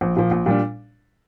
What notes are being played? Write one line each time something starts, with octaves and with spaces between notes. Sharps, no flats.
A#1
A#2 F3
A#1
A#2 G3 D4